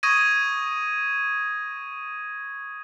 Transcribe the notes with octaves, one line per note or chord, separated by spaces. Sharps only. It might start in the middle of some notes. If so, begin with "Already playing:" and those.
C#6 D#6 G#6 A#6 D#7